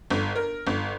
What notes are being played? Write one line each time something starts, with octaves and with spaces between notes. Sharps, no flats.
G1
A#4
G1